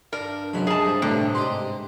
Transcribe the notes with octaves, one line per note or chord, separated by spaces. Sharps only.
G2 D4 A#4
C3 F#3 G#3 C#4 B5
G#4 D#5 A5
C3 G3
D2 A2 C3 G3 A3 D4 B4
G#2 G4 D5 D#5 C6